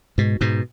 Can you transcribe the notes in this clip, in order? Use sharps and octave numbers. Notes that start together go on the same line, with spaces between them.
G#2 B2
G#2 B2